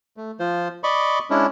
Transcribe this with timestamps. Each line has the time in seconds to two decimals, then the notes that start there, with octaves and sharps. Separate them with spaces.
0.17 A3
0.40 F3 F4 C5
0.83 D5 D#5 B5 C#6
1.30 G#3 C#4 D4 E4